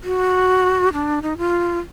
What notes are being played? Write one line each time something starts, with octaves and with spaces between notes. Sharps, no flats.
F#4
D4
D#4
F4